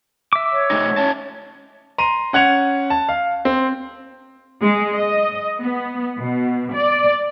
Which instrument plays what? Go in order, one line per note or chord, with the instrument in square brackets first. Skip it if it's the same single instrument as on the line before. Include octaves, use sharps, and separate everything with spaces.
[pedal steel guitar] E5 D6
[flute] C#5
[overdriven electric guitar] A3 D#4
C#4 A5
[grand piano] A#5 C6 D#7
C#4 F#5 G#6 F7
A5
F5
C4
[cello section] G#3
D#5
B3
B2
D5